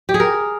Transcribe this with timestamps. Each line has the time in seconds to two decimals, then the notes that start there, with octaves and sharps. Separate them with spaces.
0.09 G4
0.14 G#4
0.20 A#4